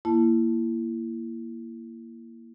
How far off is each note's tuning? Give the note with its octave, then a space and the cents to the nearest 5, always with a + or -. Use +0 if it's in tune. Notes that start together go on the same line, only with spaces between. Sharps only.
A#3 +0 E4 +20 A5 -5